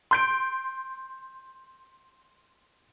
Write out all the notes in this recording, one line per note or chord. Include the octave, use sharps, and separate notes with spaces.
C6 G6 D7